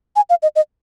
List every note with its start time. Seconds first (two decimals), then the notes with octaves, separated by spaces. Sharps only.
0.16 G#5
0.30 F5
0.43 D#5
0.56 D#5